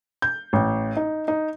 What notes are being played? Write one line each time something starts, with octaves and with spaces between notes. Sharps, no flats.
G6
A1
D#4
D#4